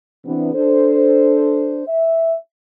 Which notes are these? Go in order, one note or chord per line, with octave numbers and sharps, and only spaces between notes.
C3 E3 B3 D4
D4 A4 C5
E5